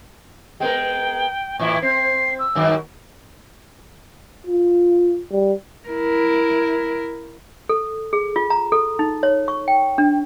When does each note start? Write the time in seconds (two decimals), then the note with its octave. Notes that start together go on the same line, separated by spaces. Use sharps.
0.60 G#3 B3 A#4 G5
1.59 A2 E3 E4 C#6
1.82 C4 C7
2.39 E6
2.55 G2 D#3 F#3
4.47 F4
5.32 G3
5.88 E4 A#4
7.69 A4
8.13 G#4
8.36 F4
8.50 A#5
8.72 A4
8.99 D#4
9.23 C#5
9.48 C#6
9.68 G5
9.98 D4